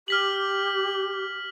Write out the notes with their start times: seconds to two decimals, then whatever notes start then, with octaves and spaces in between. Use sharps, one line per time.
0.08 G4 F6 B6 F#7